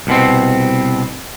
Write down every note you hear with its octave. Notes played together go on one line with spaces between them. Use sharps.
C2 B2 C4